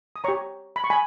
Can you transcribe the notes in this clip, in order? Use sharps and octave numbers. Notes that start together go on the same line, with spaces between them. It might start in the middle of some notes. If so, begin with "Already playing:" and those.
D#6
G4 C#5 A#5 C#6
B5
C#6
G#5 B5